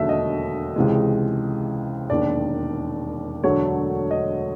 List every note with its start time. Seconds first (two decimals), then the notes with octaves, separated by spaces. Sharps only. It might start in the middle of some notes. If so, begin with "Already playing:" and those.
Already playing: E1 D#2 D3 F#3 A3 E5
0.09 D#5
0.76 C#2 C3 E3 G#3
2.10 E1 D#2 D#3 D5
3.44 E1 D2 D3 F#3 A3 C#5
4.11 D#5